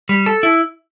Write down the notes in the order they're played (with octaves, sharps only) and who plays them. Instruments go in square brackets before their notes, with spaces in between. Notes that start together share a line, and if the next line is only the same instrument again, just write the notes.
[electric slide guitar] G3
A4
E4